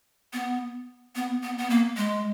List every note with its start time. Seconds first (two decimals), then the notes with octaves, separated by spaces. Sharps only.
0.33 B3
1.16 B3
1.43 B3
1.58 B3
1.70 A#3
1.97 G#3